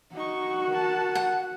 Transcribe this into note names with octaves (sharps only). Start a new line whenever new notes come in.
D#4 F#4 C#6
A#4 A5
F#5